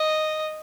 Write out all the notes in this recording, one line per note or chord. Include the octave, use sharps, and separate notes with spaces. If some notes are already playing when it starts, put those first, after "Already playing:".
Already playing: D#5